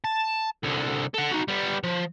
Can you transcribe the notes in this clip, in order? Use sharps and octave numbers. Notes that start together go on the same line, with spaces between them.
A5
C2 D3
A4 F#5
D#4 F#4
G3 B3
F3